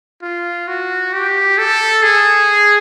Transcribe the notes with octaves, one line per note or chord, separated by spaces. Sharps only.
F4
F#4
G4
A4
G#4